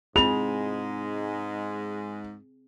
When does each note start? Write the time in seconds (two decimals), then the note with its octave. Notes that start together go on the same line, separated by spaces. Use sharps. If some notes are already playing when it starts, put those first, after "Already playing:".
0.16 G#2 G#3 C4 E4 F4 G#4 F7